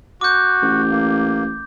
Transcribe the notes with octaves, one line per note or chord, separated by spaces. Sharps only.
F#4 D6 G6
A1
A#3